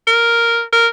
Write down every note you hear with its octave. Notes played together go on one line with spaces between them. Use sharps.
A#4
A#4